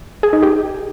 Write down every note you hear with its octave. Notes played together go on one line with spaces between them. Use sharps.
G#4
D#4
G4